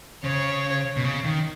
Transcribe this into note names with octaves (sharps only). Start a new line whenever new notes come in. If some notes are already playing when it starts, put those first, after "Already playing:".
C#3 C#5
B2
C#3
D#3